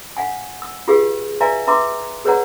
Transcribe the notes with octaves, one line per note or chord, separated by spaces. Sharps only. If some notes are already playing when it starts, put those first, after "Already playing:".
F5 F#5 G#5
E6
F4 G4 G#4 B4 F5
B4 D5 E5 F5 G#5 A#5
B4 E5 A#5 C6 D6
G#4 B4 C#5 D5 F#5 A#5